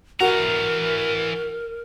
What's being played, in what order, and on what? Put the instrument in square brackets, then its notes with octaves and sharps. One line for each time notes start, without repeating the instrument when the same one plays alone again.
[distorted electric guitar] E3 A#5 [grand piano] F#4 [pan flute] A#4